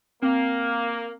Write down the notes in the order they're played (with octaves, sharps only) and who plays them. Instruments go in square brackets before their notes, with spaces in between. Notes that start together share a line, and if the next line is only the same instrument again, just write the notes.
[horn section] A#3 [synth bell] C4